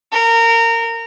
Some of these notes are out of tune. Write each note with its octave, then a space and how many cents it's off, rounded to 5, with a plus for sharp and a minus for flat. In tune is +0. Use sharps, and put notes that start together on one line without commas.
A#4 -25